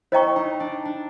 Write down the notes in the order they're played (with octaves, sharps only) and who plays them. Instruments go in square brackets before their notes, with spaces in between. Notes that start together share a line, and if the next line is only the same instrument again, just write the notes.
[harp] E4 [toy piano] C5 D#5 G5 A#5 C#6
[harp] D#4
D4
D4